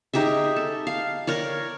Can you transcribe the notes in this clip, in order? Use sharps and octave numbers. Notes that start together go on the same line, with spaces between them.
D#4 G4 G#4 E5
A4
F5
A#4 C#5 D5